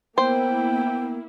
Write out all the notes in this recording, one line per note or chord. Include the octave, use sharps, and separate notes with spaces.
A#3 B3 E4 C5 G5